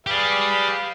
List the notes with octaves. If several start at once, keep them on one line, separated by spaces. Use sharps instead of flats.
G4 G#4 B4 D5 F5